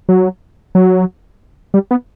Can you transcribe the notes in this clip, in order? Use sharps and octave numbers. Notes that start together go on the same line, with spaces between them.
F#3
F#3
G3
B3